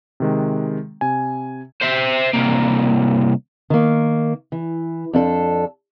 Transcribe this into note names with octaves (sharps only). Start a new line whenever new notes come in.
C3 D#3 G#3
C3 G#5
C5 E5
C2 A#3
D#3 A#3
E3
F2 D4 A4